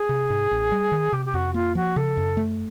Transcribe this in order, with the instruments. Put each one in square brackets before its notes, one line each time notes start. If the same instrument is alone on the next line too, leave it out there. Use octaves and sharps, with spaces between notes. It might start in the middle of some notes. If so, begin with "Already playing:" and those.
Already playing: [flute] G#4
[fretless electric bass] C3
G#2
A1
G3
D#3
[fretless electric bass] C3 [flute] G4
[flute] G4
[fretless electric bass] F2 [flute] F#4
[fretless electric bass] A#3 [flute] F4
[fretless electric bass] F3 [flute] F#4
[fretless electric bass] C#3 [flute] A4
[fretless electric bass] F#2
A3